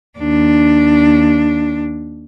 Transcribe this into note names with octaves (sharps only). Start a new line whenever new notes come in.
D#2 D4